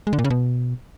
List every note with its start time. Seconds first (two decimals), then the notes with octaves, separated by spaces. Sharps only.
0.07 G#3
0.13 D3
0.19 A#2
0.24 C#3
0.30 B2